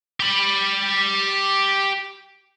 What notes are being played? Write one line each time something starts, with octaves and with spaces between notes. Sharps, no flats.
G4 B5